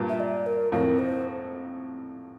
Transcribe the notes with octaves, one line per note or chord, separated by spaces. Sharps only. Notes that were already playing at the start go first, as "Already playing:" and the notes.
Already playing: G2 A#2
E5
D5
A#4
F2 A2 A#4
C5